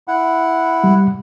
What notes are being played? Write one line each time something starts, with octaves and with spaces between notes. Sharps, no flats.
E4 F#5
G3